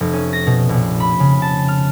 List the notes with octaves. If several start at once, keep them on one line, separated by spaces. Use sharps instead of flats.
F1
C#4
A#6
B2
A#1
B5
C#3
A5
F6